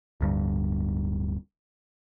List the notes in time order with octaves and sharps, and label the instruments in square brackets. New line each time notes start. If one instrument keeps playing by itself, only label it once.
[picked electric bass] D1 D2 G2